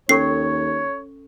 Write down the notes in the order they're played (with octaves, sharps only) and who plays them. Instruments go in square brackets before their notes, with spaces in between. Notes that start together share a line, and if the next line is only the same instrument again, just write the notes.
[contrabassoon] D#2 [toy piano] C#4 A4 C#6 [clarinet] C#5 [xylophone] C7